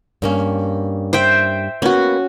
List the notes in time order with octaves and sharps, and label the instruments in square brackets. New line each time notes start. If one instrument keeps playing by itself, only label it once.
[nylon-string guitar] G2 A#3 C#4
[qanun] C5 E5 G5
[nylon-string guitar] A#3 B3 [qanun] C#4 F#4